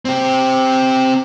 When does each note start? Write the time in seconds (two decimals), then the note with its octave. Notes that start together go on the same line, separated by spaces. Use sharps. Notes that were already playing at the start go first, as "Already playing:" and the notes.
0.05 C4 G4